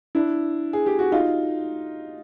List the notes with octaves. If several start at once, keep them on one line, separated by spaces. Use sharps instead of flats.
D4 E4
G#4
G4
F#4
D#4 F4